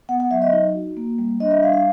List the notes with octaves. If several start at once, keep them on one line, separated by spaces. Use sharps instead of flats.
B3 F#5
F#5
F#3 E5
D#5
D#4
F#4
A#3
G3
D4 D#5
E5
G3 F5
F5